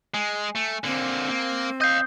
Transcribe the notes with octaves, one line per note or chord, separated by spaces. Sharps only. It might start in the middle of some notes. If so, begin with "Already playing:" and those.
G#3 G#5
A3
D3 A#3 C4
A#3
D#5 F5 D#6 G6